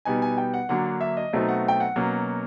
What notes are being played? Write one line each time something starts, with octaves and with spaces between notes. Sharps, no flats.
B2 G3 B3 D#4 G#5
G#5
G5
F#5
D3 F#3 A#3 D4 F#5
F#5
E5
D#5
B2 F#3 A3 C4 D#4
F#5
G5
F#5
B2 F#3 A#3 C#4